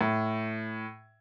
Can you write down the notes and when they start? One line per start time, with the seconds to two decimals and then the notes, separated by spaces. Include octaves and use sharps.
0.01 A2